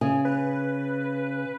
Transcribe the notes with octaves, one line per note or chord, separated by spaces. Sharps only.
C#3 G#5
B4